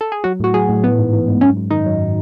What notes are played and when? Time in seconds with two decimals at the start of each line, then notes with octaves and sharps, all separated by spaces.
0.01 A4
0.12 G#4
0.24 F#3 F#4
0.40 A2 F#4
0.54 F#3 G#4
0.69 A2
0.83 E3 B3
0.98 G#2
1.13 E3
1.28 G#2
1.41 F#2 C#4
1.56 F#2
1.71 D#3 D#4
1.86 F#3